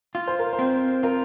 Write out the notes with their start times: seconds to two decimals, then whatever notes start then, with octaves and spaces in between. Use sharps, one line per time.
0.15 F4
0.27 C5
0.39 A#4
0.53 C5
0.59 C4
1.03 F4 A#4